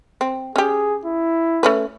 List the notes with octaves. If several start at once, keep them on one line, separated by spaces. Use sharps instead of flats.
C4
C#4 G4 G#4
E4
A3 C#4 B4